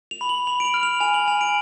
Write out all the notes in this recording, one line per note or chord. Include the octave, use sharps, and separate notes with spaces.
F7
B5
F#7
B5 F7
D7
F7
F6
F7
G#5 F7
F#7
G#5 F7
D7